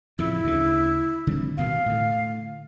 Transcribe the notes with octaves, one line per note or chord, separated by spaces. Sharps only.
F2 A2 C#3 E4
D2 C#3
D3 G3 C4
G2 B2 D#3 F5
A2 D3